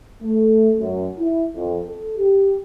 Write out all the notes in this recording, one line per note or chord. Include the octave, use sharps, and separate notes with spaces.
A3
F#2
E4
F2
A4
G4